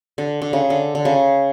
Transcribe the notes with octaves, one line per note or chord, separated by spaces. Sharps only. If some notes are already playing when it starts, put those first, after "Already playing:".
D3
D3
C#3
D3
D3
C#3